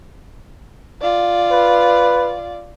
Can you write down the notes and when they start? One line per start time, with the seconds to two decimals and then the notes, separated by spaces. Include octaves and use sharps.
1.01 F4 D5
1.52 B4